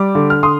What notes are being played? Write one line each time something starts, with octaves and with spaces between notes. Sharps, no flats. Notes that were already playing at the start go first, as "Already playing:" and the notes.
Already playing: G3 D6
D3
F6
D3 C6 D#6